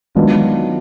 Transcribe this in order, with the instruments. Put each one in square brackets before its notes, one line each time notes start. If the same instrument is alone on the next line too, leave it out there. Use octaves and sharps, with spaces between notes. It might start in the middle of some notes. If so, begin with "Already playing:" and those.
[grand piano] D#3 F#3 B3 D4 F4 [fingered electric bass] G#3